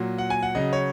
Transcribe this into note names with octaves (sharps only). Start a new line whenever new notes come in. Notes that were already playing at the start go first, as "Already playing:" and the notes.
Already playing: A#2 F#3
F#5
G#5
F#5
C#3 F#3 D#5
C#5